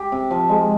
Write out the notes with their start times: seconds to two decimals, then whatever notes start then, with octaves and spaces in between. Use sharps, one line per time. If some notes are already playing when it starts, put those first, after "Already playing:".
Already playing: G4
0.12 C3
0.31 F3
0.49 G#3